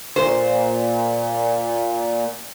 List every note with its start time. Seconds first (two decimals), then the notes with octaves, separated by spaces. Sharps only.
0.16 A#2 C5